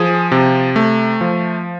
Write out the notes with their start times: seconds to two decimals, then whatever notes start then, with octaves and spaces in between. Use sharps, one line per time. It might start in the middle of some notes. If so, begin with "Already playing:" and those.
Already playing: F3 G#4
0.32 C3
0.76 A3
1.21 F3